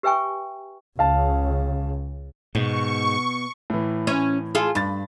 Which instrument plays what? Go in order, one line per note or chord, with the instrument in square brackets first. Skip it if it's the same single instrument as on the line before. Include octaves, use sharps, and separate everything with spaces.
[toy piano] G4 B4 E5 G5 G#5 C#6
[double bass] C#2 C#3 [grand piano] F5 A5
[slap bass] G#2 [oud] B2 [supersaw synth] C#6
[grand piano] A2 E3
[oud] C#4
F4 G#4 A4
[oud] G2 [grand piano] B5 A6